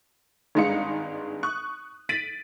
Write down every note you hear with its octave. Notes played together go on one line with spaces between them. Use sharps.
G#1 G2 G#3 D#4 F5 C#7
C#6 D#6 F#6
A6 B6 D7 D#7 F#7